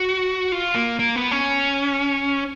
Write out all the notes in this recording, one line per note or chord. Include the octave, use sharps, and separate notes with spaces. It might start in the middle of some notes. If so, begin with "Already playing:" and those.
Already playing: F#4
F4
A#3
A#3
B3
C#4